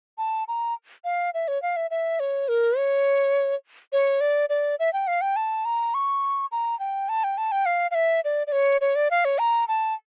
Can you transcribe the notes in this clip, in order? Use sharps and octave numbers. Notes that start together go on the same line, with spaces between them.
A5
A#5
F5
E5
C#5
F5
E5
E5
C#5
A#4
C#5
C#5
D5
D5
E5
G5
F5
G5
A5
A#5
C#6
A#5
G5
A5
G5
A5
G5
F5
F5
E5
D5
D5
C#5
C#5
D5
F5
C#5
A#5
A5